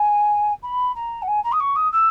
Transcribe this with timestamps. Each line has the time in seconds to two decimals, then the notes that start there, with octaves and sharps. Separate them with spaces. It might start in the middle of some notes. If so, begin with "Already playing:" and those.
Already playing: G#5
0.62 B5
0.95 A#5
1.22 F#5
1.27 G#5
1.43 A#5
1.52 D#6
1.60 C#6
1.75 D#6
1.92 E6